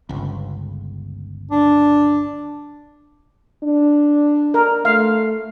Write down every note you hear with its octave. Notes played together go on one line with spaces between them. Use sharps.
G1 C#2
D4
D4
A#4
A3 F5